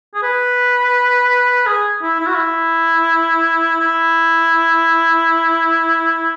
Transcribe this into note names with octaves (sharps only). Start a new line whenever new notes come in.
G#4
B4
G#4
E4
E4
F#4
E4
E4